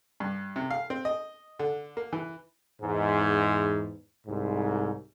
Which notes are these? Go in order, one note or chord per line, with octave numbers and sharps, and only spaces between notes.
G2
C3
F5
C4
D#5
D3
A#3
E3
E2 G#2
C2 G#2